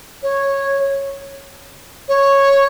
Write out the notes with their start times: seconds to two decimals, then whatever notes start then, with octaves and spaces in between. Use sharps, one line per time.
0.23 C#5
2.09 C#5